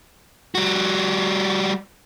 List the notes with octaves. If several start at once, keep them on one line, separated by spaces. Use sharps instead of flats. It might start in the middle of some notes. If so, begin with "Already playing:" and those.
G3 F#4